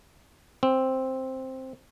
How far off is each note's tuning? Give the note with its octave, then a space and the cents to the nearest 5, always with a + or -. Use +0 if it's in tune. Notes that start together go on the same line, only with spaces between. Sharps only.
C4 +5